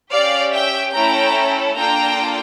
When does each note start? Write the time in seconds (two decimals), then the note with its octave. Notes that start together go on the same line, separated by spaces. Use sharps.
0.11 C#4 G4 D5 F5
0.52 E5 G5
0.94 A3 C#4 E4 A4 G5 A#5
1.77 A#3 D4 F4 A4 G5 A#5